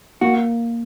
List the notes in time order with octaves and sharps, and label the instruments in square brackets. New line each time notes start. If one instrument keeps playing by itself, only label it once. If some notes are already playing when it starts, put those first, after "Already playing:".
[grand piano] A#3 [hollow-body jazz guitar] F#4